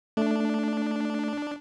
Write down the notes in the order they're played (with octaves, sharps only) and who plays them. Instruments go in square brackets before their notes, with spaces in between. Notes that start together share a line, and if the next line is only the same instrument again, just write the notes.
[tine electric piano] A3 [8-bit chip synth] D4